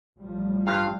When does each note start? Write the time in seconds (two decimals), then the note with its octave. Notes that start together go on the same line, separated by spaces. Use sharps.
0.19 A1 F3 G3
0.67 G2 F4 F5